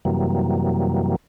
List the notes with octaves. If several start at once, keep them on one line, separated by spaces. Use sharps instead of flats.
F#2 C3 E3 F#3 G3 A#3